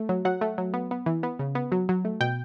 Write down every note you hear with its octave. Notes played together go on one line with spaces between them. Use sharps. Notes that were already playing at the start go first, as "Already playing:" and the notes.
Already playing: A3
F#3
F#3 F#5
A3
F#3
B3
B3
E3
B3
C#3
B3
F#3
F#3
A3
B2 G5